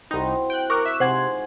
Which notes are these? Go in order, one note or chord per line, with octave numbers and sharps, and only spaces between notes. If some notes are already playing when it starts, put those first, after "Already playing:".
C2 C4 D#4 E4 F#4
G5 F#6
A#4 C#6 D6 F#6
E5 E7
C3 F3 G#3 D#4 C5 F#5 G#6